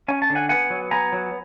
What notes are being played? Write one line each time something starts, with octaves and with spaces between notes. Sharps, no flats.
C#4 G#5
A5
D3
F#5 G#5
B3 F#5 G#5
F#3
B3 G#5 A#5
F#3